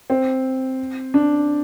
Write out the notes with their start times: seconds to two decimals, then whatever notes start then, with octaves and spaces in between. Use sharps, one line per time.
0.10 C4
1.14 D4